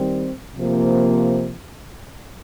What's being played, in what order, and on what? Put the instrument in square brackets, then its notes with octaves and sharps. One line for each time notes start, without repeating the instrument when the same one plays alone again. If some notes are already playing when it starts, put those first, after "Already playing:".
Already playing: [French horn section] D#3 G3 C4
C3 F3 A#3